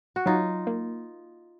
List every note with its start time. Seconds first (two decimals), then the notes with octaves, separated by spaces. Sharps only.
0.16 F#4
0.26 F#3 D#4 F4
0.67 A#3